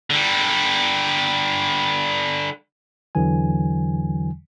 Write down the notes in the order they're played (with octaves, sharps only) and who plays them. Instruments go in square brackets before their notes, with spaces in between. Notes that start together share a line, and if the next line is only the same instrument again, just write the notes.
[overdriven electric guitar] D3 G3
[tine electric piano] E2 D3 E3 F#3 G#5